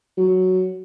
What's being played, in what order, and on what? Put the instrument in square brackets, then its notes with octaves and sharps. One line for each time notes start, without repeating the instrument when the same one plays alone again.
[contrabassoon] F#3